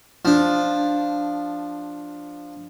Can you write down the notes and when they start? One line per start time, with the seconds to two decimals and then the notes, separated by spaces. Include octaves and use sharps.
0.25 F3 D4